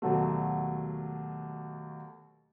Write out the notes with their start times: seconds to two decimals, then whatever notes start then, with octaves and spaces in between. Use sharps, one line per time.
0.02 D#2 B2 F#3 A3